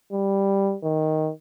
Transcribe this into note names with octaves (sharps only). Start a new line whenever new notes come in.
G3
D#3